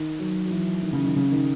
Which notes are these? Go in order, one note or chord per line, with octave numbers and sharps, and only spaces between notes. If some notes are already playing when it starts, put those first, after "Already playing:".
Already playing: D#3
F#3
F#3
E3
D#3
C#3
D#3
C#3
D#3